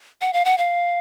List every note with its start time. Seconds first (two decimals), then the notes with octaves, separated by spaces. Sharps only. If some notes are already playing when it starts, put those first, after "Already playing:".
0.21 F#5
0.33 F5
0.45 F#5
0.58 F5